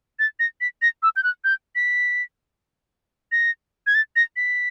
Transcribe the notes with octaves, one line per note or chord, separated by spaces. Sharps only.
A6
A#6
B6
A#6
E6
G6
F#6
G6
B6
A#6
G#6
A6
A#6
B6